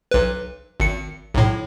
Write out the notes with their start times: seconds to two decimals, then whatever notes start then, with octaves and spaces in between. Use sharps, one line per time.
0.11 B1 B4
0.80 G#1 C#7
1.34 B1 A2